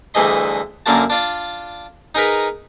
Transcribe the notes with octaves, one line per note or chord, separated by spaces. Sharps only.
D2 G2 E3 G#4 D#5 C6
F#2 D3 A#3 F#4 A5
D4 F4 D5
D#4 G#4 A#4 B4